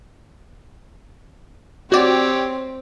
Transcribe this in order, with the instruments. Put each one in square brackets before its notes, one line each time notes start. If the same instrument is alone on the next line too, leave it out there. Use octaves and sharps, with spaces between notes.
[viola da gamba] C4 [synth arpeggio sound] F#4 D5 [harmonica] G4 C#5